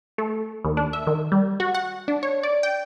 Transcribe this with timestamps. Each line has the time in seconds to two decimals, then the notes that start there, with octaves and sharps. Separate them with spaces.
0.18 A3
0.65 D#2
0.77 D4
0.93 E5
1.07 D#3
1.32 G3
1.60 F#4
1.74 F#5
2.08 D4
2.23 C#5
2.43 D5
2.63 G5